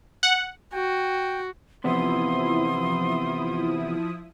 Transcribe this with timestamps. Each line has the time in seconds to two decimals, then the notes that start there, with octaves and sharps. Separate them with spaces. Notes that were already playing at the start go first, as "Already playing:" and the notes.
0.23 F#5
0.73 F#4 G5
1.84 E2 C3 F3 B3 E4 C6 D#6